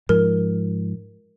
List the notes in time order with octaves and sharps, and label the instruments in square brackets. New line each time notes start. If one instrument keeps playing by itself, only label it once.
[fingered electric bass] G#2 F3 [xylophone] A#4